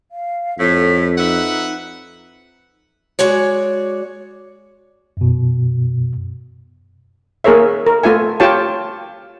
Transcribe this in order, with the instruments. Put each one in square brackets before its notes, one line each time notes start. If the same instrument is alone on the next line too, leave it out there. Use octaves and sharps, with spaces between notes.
[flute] F5
[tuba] F2 [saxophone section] A2 [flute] B6
[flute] D#4 [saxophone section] B4 E5 F#5
[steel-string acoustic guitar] G#3 F#4 C#5 D5
[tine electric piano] F#2 B2
[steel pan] A#3 G#4 A#4 C#5 E5
A#4
A3 F4 E5 G#5
F4 G4 C#5 G5 A5